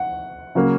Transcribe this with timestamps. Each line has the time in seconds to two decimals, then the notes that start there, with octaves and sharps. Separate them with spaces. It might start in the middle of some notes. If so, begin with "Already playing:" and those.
Already playing: F#5
0.55 C#3 F#3 A#3 C#4